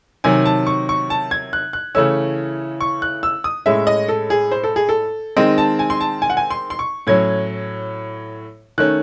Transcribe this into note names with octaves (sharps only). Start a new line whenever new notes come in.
C3 D#3 F#3 G#5
A5
C#6
C#6
A5
G#6
F#6
F#6
C#3 E3 A3 C#4 E6
C#6
F#6
E6
D#6
A2 G#3 C#4 E5
D#5
A4
G#4
C5
A4
G#4
A4
D#3 G#3 C4 D#5
A5
G#5
C6
A5
G#5
F#5
G#5
C6
C6
C#6
A2 F#3 C#4 G#6
D#3 A3 C#4 F#6